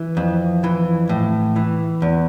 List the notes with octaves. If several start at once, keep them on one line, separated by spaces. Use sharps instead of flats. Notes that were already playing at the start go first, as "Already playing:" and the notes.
Already playing: E3
F2
E3
A2
E3
E2